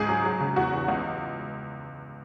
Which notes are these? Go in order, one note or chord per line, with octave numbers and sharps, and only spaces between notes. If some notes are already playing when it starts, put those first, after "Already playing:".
Already playing: C#2 G#2 G#4
F#3
F#3
C#3
E2 F#4
E2
C#2